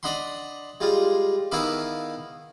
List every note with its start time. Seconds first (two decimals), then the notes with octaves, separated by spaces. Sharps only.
0.03 D4 D#5 F#5 B5 C6
0.80 G3 G#3 F4
1.52 D#3 B3 E4 F5 B5 D6